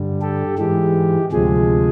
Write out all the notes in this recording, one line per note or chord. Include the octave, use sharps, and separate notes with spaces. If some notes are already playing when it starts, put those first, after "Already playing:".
Already playing: G2 D3 G3
G4 A4
G#2 E3 G#3 G4
D2 C3 F3 G#3 G#4